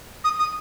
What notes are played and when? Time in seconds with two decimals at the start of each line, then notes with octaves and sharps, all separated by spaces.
0.24 D#6
0.39 D#6